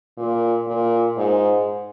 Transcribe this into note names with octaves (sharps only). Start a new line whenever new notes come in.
A#2
A#2
G#2